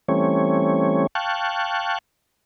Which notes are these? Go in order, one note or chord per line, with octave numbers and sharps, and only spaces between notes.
E3 G3 A3 C4 C#4 C#5
F5 G5 A5 C#6 F#6